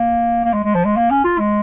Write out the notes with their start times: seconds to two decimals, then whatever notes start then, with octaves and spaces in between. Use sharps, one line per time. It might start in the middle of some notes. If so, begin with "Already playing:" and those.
Already playing: A#3
0.44 A#3
0.54 G#3
0.64 G#3
0.75 F3
0.85 G#3
0.97 A#3
1.10 C#4
1.24 F4
1.39 G#3